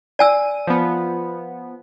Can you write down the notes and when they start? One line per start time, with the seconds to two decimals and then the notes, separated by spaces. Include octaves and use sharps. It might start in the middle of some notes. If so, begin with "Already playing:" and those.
0.19 D5 G#5 E6 D#7
0.67 F3 B3